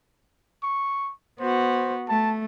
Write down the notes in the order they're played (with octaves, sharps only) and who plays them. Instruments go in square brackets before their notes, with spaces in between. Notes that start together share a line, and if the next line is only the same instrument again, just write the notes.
[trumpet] C#6
[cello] B3 F#4 [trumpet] C5
[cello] A3 [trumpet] A5